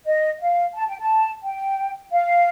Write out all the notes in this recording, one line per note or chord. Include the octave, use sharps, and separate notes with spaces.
D#5
F5
A5
G5
A5
G5
F5